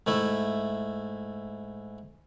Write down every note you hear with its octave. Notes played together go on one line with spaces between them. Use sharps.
G#2 A3 E4